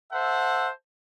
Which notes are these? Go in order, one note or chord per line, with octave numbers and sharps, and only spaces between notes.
A4 C5 E5 F#5